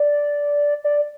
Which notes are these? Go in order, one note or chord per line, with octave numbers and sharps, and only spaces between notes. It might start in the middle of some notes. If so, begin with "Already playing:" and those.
Already playing: D5
D5